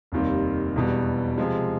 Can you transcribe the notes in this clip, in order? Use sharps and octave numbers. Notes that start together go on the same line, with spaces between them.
F1 D#2 D#3 G3 C4
E1 E2 B2 G3 B3
C3 F3 G#3